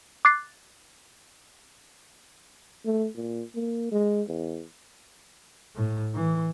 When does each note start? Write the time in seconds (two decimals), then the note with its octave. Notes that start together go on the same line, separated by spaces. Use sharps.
0.25 D6 F#6 A6 C7
2.85 A3
3.15 A#2
3.55 A#3
3.91 G#3
4.28 E2
5.76 A2
6.14 E3